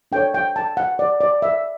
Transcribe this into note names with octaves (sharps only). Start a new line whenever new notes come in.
D4 A4 C#5 G5
G5
A5
F#5
D5
D5
E5